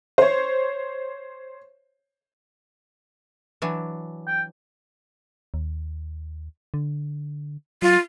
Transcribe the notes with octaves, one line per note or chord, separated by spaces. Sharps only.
C5 C#5
E3 F#3 D4
G5
D#2
D3
F#3 F4